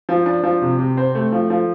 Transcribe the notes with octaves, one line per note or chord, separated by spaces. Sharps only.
F3
D4
F3
C3
C3
C4
A3
F3
F3